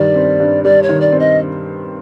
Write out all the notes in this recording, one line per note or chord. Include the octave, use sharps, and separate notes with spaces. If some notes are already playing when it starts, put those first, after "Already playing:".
Already playing: G2 D#3 G3 D5
C4
G2
G3 D5
C#5
D#3
D5
C4
D#5